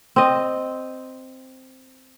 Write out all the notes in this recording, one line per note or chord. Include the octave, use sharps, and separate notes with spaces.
C4 D#5